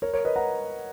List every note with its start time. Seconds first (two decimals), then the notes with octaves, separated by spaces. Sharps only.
0.02 A#4 C#5
0.14 A#4 C#5
0.25 B4 D#5
0.36 F#5 A#5